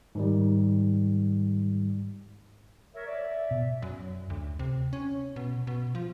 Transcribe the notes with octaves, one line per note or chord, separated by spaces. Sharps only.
G#2 D#3 G3
A#4 C#5 E5
D5 E5
B2
F#2
D2
C3
C#4
B2
B2
F3